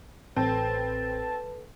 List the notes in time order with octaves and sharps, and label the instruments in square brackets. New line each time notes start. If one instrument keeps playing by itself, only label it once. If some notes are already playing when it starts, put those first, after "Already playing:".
[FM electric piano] A1 G5 [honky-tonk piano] C4 [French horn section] A4 B4 [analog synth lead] A5